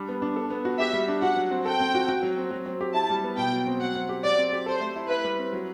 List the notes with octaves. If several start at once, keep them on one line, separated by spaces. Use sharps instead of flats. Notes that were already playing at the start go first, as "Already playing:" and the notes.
Already playing: G3 D4
B3
D4
A4
B3
F#4
G4 E5
G3
D4
F#4 F#5
F#3
C4
A4 G5
C4
F#4
F#4
F#3
C4
F#3
C4
G4
E4 A5
G3
B3
B2 G5
F#3
C4
F#3 F#5
C4
G4
F#3 D5
C4
G4
A4 C5
A3
E4
E4 B4
G3
C4
F#3